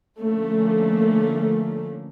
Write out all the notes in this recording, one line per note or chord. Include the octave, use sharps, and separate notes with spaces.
D3 F3 A3 A#3 C#4